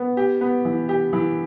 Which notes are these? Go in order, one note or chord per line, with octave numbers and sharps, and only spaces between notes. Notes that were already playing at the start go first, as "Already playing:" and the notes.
Already playing: B3
G4
B3
E3
G4
E3